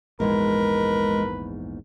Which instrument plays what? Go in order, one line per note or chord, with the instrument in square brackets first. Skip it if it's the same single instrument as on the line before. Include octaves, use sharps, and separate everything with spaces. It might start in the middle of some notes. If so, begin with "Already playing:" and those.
[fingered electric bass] A#1 E2 G#2 [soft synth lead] G#3 [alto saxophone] A#4 [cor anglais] B4